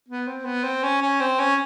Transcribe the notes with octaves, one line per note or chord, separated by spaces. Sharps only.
B3
C4
B3
C4
C#4
C#4
C4
C#4